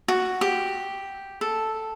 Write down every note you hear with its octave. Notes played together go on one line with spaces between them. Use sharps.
F#4
G4
A4